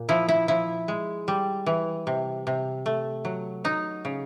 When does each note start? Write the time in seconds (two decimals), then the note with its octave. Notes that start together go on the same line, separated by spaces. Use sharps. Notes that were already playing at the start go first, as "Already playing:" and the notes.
Already playing: A#2
0.09 F3 E4
0.28 E4
0.48 F3 E4
0.88 G#3
1.28 G3
1.66 E3
2.07 C3
2.47 C3
2.86 A3
3.25 F#3
3.64 F#3 D#4
4.05 C#3